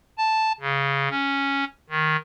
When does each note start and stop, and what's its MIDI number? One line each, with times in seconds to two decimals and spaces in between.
0.18 0.52 81
0.60 1.09 49
1.10 1.64 61
1.89 2.16 51